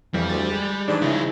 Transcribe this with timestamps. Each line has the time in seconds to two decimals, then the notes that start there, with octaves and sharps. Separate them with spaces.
0.14 F2 E3 F3 G3
0.29 D2 A6
0.50 G#3
0.88 G#2 E3 G3 D4
1.02 C#3 F3 D#4 E4